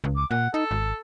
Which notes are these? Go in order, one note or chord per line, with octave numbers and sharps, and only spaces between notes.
C#2
D6
A#2 F#5
D#4 A4
G#1